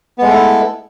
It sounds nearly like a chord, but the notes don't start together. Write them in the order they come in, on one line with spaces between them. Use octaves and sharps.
B3 G#3 A3 A4 E4